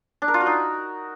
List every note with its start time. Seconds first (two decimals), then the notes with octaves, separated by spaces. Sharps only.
0.22 D4
0.28 A#4
0.34 F4
0.40 F#4
0.46 D#4